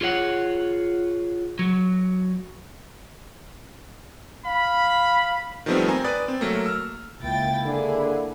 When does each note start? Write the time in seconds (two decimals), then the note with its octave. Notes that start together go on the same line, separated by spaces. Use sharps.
0.01 F4 G#4 C#5 F#5
1.59 F#3
4.45 F5 B5
5.66 D#3 F3 G3 A3 B3 C4
5.88 C4 G#5 A#5
6.04 B4 D5 D#6 A6
6.28 C4
6.41 F#3 A3 A#3
6.66 E6 F6
7.23 C#2 A#3 E4 G5 A6
7.66 D3 G#4